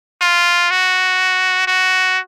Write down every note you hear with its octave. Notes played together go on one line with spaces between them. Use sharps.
F4
F#4
F#4